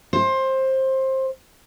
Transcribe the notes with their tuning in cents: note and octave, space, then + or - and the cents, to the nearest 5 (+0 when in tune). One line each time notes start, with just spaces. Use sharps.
C5 +20